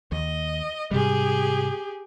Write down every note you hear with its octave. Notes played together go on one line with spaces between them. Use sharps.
D#2 D#5
G#2 C3 G3 G4 G#4